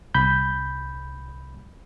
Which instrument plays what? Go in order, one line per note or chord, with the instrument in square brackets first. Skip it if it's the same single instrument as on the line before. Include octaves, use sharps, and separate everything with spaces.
[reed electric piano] C2 B5 G6